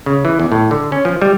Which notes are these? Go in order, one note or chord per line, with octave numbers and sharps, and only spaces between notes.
C#3
E3
E2
A2
D3
C#4
F3
G3